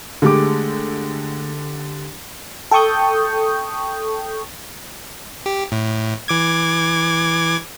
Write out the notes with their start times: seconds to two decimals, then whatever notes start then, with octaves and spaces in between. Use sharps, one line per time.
0.22 D3 G#3 A3 G4 D6
2.71 A4 G5 A5 C#6 D#6 G6
5.46 G4
5.72 A2
6.28 E3 D6 G#6